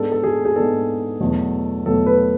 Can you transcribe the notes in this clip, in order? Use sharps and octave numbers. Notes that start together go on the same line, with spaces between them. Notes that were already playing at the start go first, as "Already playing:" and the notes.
Already playing: G#2 G#3 B3 D4 A4
A4
G#4
G#4
G#2 G#3 B3 D4 A4
E2 B2 F#3 A3
E2 B2 F#3 A3 A4
B4